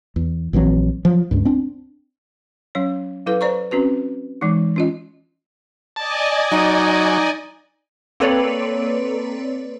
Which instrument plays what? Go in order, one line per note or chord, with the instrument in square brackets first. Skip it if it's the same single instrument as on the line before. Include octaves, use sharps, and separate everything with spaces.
[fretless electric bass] E2
A#1 E3 F#3 C4
F3 F#3
C#2 G2
C4 D4
[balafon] F#3 C#4 C#5
F#3 E4 A4 B4 F5
B4 C5 D5 A#5 C#6
C4 C#4 F#4 B4
E3 G#3 D#4
C#4 F4 D#5
[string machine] D5 D#5 G#5 [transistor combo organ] A5
[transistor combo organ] F#3 [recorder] D#4
[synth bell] A#3 C4 A4 B4 C#5 D5